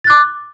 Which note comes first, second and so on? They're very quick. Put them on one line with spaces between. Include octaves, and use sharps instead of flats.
A6 F#6 D6